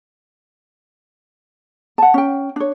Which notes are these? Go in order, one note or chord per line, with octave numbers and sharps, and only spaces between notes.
F#5 A5
C#4 G5
D4 C#5